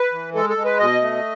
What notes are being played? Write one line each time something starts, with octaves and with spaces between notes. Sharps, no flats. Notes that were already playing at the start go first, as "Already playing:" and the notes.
Already playing: B4
E3
G#3 A4
A4
G#3
B4
B2 D#5
A3